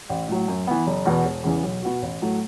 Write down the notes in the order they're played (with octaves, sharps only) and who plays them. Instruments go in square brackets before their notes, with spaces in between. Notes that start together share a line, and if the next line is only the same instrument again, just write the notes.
[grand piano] A1
A2 F#3
F#2
E3 B3
F#1
E2 B2 B3
E1
E2 C#3 E3
B1
B2 B3 F#4
A1
A2 F#3 A3